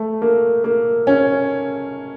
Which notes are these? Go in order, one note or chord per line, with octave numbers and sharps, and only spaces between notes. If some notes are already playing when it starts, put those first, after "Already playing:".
Already playing: A3
A#3
A#3
C#4